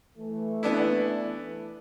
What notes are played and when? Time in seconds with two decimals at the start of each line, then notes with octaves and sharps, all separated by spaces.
0.18 E3 A3
0.63 B3 D4 E4